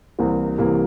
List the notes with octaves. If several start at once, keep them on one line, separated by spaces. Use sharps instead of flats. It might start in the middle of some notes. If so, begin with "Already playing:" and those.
C2 C3 E3 A#3
C2 C3 E3 A#3